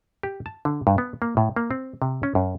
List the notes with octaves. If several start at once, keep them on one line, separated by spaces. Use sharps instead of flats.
G4
A5
D3
G2
B3
A#3
A2
A#3
C4
C3
C#4
F#2